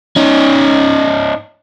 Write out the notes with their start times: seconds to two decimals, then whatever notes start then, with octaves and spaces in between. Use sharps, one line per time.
0.16 C#4 D#4